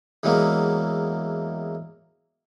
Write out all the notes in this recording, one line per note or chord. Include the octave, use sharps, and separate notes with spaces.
E2 E3 F#3 G#3 A#3